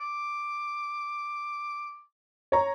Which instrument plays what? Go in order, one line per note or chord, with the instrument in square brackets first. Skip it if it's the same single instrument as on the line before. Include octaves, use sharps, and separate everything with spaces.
[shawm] D6
[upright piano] C#5 A#5